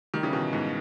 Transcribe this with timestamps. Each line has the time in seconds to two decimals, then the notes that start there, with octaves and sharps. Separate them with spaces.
0.14 D#3 G3
0.23 C#3 E3
0.33 B2 D#3
0.53 G#2 B2